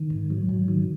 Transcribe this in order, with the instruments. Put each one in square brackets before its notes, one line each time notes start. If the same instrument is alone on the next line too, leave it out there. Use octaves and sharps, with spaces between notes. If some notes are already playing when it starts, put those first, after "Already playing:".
Already playing: [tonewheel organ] D#3
G#2
F#3
G#2
D#3